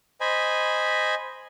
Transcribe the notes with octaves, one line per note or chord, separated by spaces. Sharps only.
C5 D#5 G#5 B5